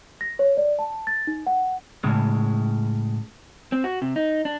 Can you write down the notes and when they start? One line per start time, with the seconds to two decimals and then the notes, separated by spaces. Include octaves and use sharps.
0.21 A#6
0.39 C#5
0.57 D5
0.79 A5
1.07 A6
1.27 D#4
1.47 F#5
2.04 A2 C#3 G#3
3.72 C4
3.84 F#4
4.02 C3
4.16 D#4
4.45 D4